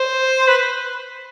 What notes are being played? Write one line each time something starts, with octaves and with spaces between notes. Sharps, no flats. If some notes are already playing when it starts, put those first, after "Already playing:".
Already playing: C5
B4